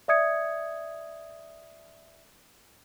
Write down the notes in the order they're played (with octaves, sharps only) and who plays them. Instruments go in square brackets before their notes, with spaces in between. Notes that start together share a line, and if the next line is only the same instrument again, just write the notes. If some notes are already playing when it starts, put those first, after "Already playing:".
[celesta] D5 E5 D#6 G#6 C#7